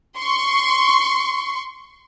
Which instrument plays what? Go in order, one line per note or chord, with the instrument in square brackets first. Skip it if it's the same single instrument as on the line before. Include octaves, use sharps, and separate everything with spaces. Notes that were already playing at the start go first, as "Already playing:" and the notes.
[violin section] C6 C#6